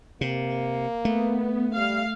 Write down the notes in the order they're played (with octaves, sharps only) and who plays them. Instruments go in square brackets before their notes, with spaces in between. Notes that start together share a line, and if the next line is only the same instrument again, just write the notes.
[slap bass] C3 [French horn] A#3
[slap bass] A3 [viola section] B3
[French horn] G3 [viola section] F5